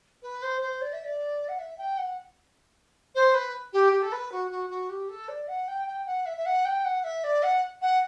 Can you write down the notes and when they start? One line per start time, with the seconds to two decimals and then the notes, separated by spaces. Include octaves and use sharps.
0.22 B4
0.42 C5
0.61 C5
0.81 D5
0.93 E5
1.04 D5
1.48 F#5
1.59 E5
1.78 G5
1.98 F#5
3.15 C5
3.34 B4
3.73 G4
3.92 G4
4.02 A4
4.12 B4
4.32 F#4
4.51 F#4
4.70 F#4
4.89 G4
5.09 A4
5.28 D5
5.48 F#5
5.68 G5
5.87 G5
6.06 F#5
6.26 E5
6.37 E5
6.45 F#5
6.65 G5
6.84 F#5
7.04 E5
7.24 D5
7.43 F#5
7.81 F#5